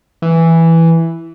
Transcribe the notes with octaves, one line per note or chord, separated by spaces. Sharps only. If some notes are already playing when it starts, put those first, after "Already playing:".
E3